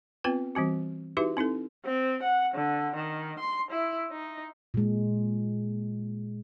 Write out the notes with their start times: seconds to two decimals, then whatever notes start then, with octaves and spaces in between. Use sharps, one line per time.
0.24 B3 C4 F4 B4 G5
0.55 E3 G3 C4 F#4
1.17 D#4 E4 F#4 G4 B4 E5
1.37 C4 D#4 E4 A4
1.85 C4
2.23 F#5
2.55 D3
2.95 D#3
3.39 C6
3.71 E4
4.12 D#4
4.74 A#2 G#3